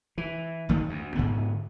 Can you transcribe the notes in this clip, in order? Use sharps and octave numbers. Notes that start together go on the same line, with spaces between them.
E3
F#1 D#3 A3 A#3
D2
G#2 D3 B3